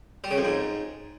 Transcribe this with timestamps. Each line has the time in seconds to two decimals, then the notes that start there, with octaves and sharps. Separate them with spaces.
0.24 G3
0.31 C#3
0.38 F2
0.45 G#2